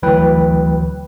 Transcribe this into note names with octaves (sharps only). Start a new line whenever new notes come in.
G#1 D2 E3 F#3 B4 G5